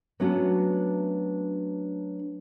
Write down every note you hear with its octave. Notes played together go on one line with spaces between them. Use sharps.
F#3 A3 B3 C#4 D4 F#4